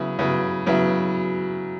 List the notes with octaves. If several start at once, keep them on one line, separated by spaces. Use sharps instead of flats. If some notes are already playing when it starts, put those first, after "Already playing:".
Already playing: C#3 F#3 B3 E4
C#3 F#3 B3 E4
C#3 F#3 B3 E4